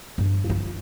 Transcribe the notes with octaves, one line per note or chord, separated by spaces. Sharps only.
G2
F4